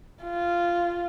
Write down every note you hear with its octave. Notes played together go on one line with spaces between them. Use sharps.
F4